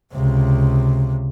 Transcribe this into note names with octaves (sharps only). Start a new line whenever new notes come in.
C#2 C3